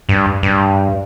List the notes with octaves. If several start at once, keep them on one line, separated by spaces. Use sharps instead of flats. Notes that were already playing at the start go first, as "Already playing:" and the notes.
G2
G2